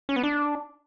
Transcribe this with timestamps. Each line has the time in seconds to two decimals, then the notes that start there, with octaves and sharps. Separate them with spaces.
0.09 C#4
0.16 B3
0.23 D4